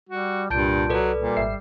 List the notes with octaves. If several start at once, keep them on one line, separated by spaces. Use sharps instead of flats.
G3 F#4
C2 G2 A#2 A5 G6 D7
F#3 A4 B4 D5
A#2 G3
G#1 E5 C7